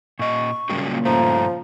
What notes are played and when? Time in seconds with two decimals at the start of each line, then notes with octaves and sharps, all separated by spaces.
0.19 A#2 D#5 C#6
0.70 A#2 C#3 F#3 G3 A#3
1.05 G2 F3 A3 A#5